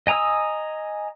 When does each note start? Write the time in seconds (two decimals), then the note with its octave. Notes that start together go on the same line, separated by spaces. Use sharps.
0.07 D#5 G#5 A#5 D#6 E6